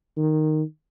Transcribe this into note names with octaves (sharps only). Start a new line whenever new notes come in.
D#3